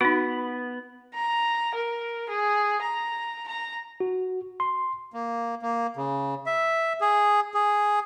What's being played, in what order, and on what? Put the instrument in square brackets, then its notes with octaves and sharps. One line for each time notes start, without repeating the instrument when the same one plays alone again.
[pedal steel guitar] B3 [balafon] D#4 F#4
[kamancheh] A#5
A#4
G#4
A#5
A#5
[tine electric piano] F#4
C6
[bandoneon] A#3
A#3
C#3
E5
G#4
G#4